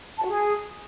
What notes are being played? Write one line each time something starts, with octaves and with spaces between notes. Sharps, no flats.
A5
F#4
G#4